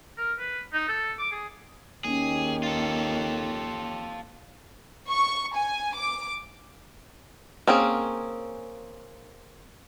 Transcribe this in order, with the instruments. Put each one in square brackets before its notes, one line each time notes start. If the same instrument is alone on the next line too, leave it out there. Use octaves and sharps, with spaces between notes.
[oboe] A#4
B4
D#4
A4
D6
G#4
[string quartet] D#2 G4 C#5 [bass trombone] D#3 [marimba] A#3 C#4 [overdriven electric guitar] G#4
[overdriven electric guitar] F4 A4
[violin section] C#6
G#5
D6
[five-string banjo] A#3 C4 C#4 G#4